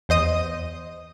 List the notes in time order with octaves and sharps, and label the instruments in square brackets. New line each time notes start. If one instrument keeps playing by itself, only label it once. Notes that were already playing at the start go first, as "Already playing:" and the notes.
[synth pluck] E2 C5 D#5 D#6